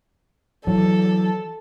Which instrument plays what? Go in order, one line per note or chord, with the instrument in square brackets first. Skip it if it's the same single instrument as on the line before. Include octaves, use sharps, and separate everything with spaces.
[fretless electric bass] E3 F#3 [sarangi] A4